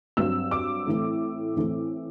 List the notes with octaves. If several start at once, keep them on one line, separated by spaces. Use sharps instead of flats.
G2 F#3 C4 E6
D6
A2 E3 A3 C4
A2 E3 A3 C4